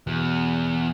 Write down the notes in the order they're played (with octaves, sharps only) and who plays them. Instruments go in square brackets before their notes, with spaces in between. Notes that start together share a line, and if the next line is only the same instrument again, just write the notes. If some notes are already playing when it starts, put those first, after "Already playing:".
[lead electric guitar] E2 [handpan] B2